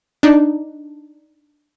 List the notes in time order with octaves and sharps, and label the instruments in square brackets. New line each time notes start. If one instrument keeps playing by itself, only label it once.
[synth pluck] D4 D#4